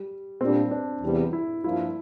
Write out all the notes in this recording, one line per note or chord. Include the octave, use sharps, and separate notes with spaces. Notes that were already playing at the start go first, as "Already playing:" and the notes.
Already playing: G3
A#2 G3 C4 D4
D4
E2 C3 G3
E4
G2 F3 A#3 D4 E4 F4